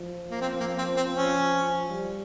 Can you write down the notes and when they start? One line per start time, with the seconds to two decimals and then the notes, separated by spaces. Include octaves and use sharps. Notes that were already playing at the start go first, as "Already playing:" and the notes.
Already playing: F3
0.31 A#3
0.41 C4
0.60 A#3
0.78 C4
0.96 C4
1.15 C#4
1.90 G3